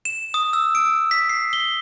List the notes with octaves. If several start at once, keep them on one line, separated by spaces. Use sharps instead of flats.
E7
D#6
E6
D7
B6
C7
G7